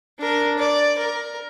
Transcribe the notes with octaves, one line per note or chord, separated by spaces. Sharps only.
D4 A#4
D5
A#4